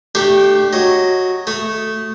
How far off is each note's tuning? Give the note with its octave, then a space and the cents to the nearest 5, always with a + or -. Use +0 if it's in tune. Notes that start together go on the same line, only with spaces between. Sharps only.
A3 +0 D4 +30 G4 +0
F#3 -5 D#5 +0
A3 +0 D#6 +0